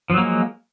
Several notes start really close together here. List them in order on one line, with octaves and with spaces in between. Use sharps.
F3 F#3 A#3 G#3